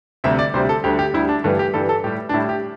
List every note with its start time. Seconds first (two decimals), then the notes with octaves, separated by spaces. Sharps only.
0.24 D2 C3 G3 E5
0.39 D5
0.54 D2 C3 G3 C5
0.69 A4
0.84 D2 D3 G3 G4
0.99 G4
1.14 D2 D3 G3 E4
1.29 D4
1.44 G2 E3 G3 A3
1.59 G4
1.74 G2 E3 G3 A4
1.89 A4
2.04 A2 G3 G4
2.29 D4
2.34 A2 G3 E4
2.49 G4